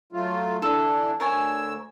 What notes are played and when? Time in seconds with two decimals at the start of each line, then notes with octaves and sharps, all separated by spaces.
0.12 F#3 A3 F4
0.62 E3 D4 E4 A4
1.20 D2 A#4 C#5 G#5 E6